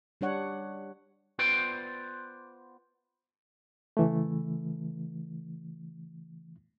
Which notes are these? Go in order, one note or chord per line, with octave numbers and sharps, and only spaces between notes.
G3 D4 C#5 F#5
B3 F4 B4 C5 D5 G5
C#3 E3 A3